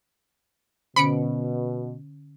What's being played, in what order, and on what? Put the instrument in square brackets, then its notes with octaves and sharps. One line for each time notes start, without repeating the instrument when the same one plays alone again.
[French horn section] B2 [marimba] D3 C#4 [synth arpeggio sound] B5 C#7 D7